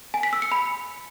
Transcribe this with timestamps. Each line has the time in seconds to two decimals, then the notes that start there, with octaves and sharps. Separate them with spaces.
0.14 G#5
0.23 B6
0.33 E6
0.42 C#7
0.52 B5